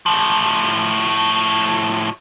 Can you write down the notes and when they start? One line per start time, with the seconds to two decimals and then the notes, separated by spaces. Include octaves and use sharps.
0.06 A2 F3